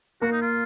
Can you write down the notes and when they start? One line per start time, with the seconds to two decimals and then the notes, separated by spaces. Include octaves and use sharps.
0.21 A#3 F#4 A#4
0.32 D#4
0.42 F4